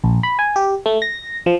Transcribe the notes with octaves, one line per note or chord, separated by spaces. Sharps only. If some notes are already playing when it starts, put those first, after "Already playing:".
A#1
B5
G#5
G4
A3
A#6
F3